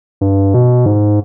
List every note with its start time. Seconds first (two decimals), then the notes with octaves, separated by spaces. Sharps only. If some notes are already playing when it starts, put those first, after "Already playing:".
0.21 G2
0.54 B2
0.86 G#2